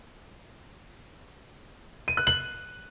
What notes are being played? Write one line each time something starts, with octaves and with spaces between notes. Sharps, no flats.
D#7
F#6
F#7